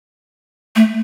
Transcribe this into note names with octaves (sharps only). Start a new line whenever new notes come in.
A3